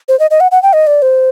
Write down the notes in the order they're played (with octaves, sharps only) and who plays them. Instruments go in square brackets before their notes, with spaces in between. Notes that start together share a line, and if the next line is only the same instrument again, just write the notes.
[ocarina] C5
D#5
D#5
F#5
F#5
G5
D#5
D5
C5